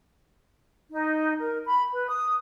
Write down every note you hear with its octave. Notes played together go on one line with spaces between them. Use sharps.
D#4
A#4
B5
B4
D#6